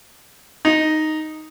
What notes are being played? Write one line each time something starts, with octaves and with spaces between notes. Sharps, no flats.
D#4